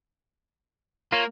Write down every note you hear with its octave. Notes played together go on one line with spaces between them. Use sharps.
A#3 F4 C#5